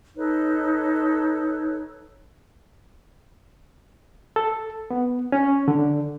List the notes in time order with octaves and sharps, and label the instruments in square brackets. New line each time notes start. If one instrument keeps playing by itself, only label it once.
[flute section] D#4 A4 B4 C#5
[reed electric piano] A4
B3
C#4
D3